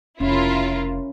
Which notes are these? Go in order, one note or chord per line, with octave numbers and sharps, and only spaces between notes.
F1 C#4 E4 F4 A#4